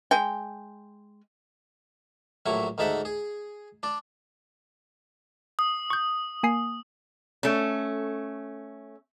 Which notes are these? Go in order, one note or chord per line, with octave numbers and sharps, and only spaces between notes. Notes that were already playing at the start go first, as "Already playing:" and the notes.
G#3 G5
A#1 A2 F#3 E4 C#6
D2 G#2 D#4 A4 E5 F#5
G#4
D4 D5
D#6
C#6 G6
A#3 G#5 C7
A3 C#4